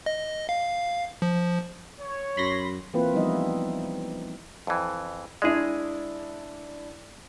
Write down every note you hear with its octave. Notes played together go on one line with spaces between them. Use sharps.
D#5
F5
F3
C#5
F#2 B5 C6 A#6
E3 A#3 C4 E4 F4 B4
F3 G3 B3 D#4 E4 D#5
F2 E3
G#3 D4 E4 G#4 D5